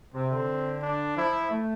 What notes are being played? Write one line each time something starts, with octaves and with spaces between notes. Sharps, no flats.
C3 C4
D3
D4
F3 E4
A3